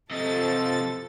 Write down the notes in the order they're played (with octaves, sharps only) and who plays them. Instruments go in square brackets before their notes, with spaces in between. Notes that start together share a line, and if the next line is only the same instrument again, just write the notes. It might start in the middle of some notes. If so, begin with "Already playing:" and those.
[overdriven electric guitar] C3 D#5 [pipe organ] F3 A6 [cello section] A4